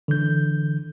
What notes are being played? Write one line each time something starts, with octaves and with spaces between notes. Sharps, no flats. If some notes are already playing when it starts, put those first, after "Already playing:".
D3 E3 G6